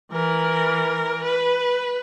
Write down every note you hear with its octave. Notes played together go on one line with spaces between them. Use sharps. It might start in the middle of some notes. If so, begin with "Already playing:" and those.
E3 A#4
B4